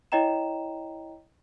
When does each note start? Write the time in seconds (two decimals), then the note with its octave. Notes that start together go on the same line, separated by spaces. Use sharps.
0.12 E4 C#5 D#5 G5 A#5 E7